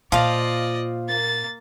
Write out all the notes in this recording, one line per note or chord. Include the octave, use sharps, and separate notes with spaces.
A#2 F3 F4 C5 D5 D#5 F5
A#3 A6